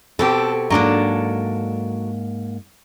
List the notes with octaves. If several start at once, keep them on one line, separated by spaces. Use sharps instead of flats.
B2 C4 G4 A4
G#2 F#3 A#3 D4 A4